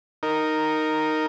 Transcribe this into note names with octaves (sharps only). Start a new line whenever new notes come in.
D#4 A#4